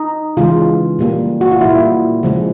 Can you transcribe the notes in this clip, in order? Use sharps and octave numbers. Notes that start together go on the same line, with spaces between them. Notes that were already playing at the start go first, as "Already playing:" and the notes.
Already playing: D#4
C#3 E3 G#3 F4
A#2 G3 A#3
F#4
F4
A#2 G3 A#3 E4
C#3 F3 G#3